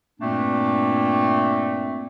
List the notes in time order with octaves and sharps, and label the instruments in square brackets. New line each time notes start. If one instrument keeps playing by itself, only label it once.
[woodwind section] G2 A#2 A3 A#3 C4 D4